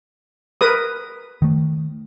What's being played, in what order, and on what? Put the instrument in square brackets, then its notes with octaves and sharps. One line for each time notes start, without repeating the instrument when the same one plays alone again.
[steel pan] A#4 B4 D#6
[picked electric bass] D#3 A3